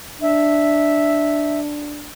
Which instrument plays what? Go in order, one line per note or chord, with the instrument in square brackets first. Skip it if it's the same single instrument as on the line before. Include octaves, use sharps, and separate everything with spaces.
[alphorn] D4 [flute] E5